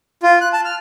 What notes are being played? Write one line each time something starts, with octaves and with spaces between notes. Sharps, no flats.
F4
F#6
A5
F6